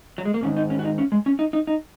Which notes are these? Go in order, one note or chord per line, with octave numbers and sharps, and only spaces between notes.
F#3
G#3
A#3
G#2 D#3 C#4
D#4
C#4
F#4
D#4
C#4
G#3
C#4
D#4
D#4
D#4